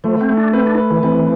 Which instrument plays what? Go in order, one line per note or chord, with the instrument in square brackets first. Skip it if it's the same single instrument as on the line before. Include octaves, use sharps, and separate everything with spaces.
[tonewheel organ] F3 [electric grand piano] A3
[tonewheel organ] C4
[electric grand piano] A3
[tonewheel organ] D4
[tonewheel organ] C4 [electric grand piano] B4
[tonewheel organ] D4
[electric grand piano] B4
[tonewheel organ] E3
[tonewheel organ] E3 [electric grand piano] C4